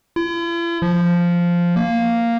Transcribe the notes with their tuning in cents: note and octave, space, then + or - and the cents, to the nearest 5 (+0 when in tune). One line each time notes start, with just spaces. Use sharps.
E4 +45
F3 -5
A#3 -5